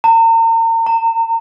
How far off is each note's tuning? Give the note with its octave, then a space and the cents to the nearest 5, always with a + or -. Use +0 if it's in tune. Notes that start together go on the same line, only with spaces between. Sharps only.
A#5 -40
A#5 -25